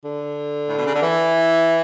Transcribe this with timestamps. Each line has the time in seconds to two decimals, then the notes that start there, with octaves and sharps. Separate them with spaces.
0.03 D3
0.68 A2
0.77 B2
0.85 C#3
0.94 D3
1.03 E3